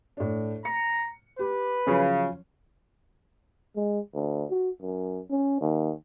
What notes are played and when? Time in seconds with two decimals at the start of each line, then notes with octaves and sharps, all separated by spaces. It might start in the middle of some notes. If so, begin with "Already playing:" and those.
0.17 A2 D4
0.65 A#5 C#7
1.39 G4 B4
1.87 C#3 F3 F#3 C#4
3.76 G#3
4.14 D2
4.50 F#4
4.82 F#2
5.30 C#4
5.61 D#2